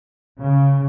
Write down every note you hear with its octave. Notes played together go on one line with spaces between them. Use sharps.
C#3